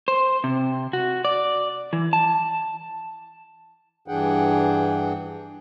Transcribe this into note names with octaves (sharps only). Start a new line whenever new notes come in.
C5
C3
F#4
D5
E3
A5
G2 E3 D4 G#4 F#5 G5